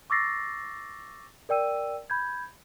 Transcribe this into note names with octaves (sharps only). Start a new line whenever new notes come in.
C#6 D6 E6 A6 A#6 C7
A#4 D5 G5 E6 D#7
B5 G6 G#6